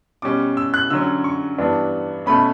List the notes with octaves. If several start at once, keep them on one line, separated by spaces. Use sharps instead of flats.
B2 G3 C#4 D6
E6
F#6
D3 F#3 C#4 E6
C#6
G2 E3 B3 D4
B2 A3 C#4 B5